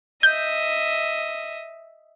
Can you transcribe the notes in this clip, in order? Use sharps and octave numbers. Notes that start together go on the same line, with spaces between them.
D#5 E5 G6